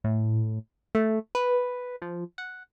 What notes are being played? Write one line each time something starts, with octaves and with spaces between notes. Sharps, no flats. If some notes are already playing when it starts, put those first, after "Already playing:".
A2
A3
B4
F3
F#5